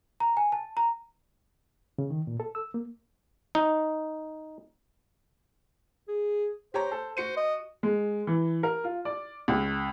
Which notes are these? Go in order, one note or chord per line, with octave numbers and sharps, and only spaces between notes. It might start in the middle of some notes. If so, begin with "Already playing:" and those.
A#5
G#5
A5
A#5
C#3
D#3
A#2
A4
E6
A#3
D#4
G#4
G4 C5 C#5 A#5
A4
F#4 C5 C#7 D#7
D#5
G#3
E3
A#4
F4
D5
C#2